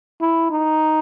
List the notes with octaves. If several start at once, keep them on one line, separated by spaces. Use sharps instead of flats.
E4
D#4